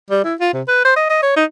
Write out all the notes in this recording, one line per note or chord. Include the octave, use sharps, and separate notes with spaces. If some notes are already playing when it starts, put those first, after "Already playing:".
G3
E4
F4
C3
B4
C5
D#5
D#5
C#5
D#4